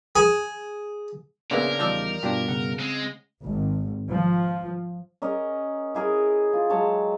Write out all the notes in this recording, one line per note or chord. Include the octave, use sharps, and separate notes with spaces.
G#4
A#1 C#3 B3 C#4 G#4 A#4 D5 E5
E2 F3 G3 D#4 D5 E6
G2 B2 D4 F4 G4
C#3 F#5
G#3 C4
G#1
F3
C#4 A#4 D#5
E4 G#4 A#4
F4
F#3 G#3 C#5 A5